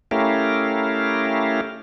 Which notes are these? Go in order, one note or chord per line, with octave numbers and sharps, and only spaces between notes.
A3 C#4 E4 G4 A#4 F5